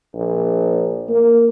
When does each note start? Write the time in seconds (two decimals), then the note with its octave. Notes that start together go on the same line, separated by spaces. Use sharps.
0.14 A#1
1.09 A#3